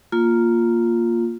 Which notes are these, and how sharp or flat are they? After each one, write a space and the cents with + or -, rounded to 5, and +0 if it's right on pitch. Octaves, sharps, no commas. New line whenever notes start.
A#3 +0 F4 +0